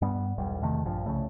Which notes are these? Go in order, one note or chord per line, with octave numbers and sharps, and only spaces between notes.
G2 G3 B3
E1 B1 G3
E2 C3 D#3 A3
A#1 G2 F3
C2 C#3 A3